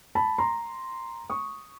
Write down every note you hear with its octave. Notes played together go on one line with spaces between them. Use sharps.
A5 B5
A#5 C6
C#6 D#6